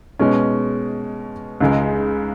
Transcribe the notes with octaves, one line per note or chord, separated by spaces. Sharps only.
B2 G#3 C#4
C#2 C#3 G#3